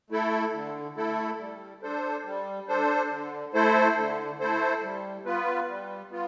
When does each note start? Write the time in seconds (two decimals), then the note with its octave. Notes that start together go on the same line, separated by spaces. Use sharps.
0.10 A3 E4 A4
0.53 D3
0.96 A3 E4 A4
1.39 G3
1.82 D4 A4 C5
2.25 G3
2.68 D4 A4 C5
3.11 D3
3.54 A3 E4 A4 C5
3.97 D3
4.40 A3 E4 A4 C5
4.83 G3
5.26 B3 F4 B4
5.68 G3
6.11 B3 F4